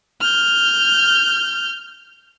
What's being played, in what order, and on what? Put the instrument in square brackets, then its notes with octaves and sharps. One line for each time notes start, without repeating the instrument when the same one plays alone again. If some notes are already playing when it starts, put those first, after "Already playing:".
[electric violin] F6 G6